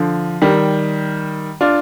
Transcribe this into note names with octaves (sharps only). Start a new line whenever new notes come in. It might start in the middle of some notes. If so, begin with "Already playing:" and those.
Already playing: D3 F3
D#3 G3
D4 F4